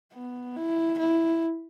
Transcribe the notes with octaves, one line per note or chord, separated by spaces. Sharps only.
B3
E4
E4